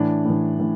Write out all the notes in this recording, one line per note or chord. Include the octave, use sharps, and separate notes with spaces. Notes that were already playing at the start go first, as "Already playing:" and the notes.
Already playing: A2 E3 D4
A2
E3
A2 E3